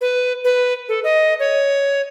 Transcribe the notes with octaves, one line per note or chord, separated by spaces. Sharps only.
B4
B4
A4
D#5
C#5